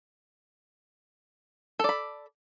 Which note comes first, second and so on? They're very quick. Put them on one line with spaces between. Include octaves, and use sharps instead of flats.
A4 D5 B5